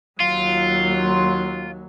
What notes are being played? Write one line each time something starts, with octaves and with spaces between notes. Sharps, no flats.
D#2 F#3 F4